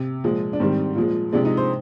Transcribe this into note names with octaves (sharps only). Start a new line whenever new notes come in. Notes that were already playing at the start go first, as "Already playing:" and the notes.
Already playing: C3
A#2 F3 G#3
D4
G#2 D#3 G3 C4
A#2 F3 G#3
C3 F3 G#3 D4
D#4
C5